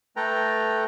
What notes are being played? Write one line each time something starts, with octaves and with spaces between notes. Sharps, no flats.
A3 A4 B4 G5 A#5